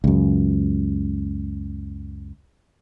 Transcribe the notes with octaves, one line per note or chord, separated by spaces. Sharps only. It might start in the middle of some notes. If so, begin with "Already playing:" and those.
C#2 F#2